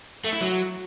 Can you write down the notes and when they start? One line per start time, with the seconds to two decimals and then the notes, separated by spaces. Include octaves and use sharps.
0.24 A3
0.33 E4
0.41 F#3